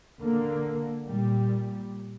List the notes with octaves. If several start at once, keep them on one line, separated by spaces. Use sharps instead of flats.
D3 A#3
A#2 G3